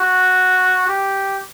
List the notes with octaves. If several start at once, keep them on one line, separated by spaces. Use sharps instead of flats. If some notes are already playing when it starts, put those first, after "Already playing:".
Already playing: F#4
G4